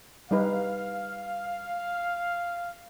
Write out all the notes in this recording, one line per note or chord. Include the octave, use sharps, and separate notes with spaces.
G3 D#4 B4 F5